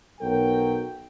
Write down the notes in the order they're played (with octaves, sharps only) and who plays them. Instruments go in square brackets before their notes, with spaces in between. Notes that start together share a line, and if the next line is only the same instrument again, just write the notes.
[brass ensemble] B1 F#3 A#4 G5